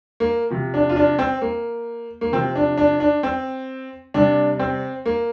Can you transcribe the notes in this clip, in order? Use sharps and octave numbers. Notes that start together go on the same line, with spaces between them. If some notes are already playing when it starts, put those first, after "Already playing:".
A#3
C3 F3
D4
F4
D4
C4
A#3
A#3
C3 F3 C4
D4
D4
D4
C4
C3 G3 D4
C4
A#3